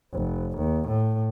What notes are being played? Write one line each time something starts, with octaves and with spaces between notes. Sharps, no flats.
F1
D#2
A2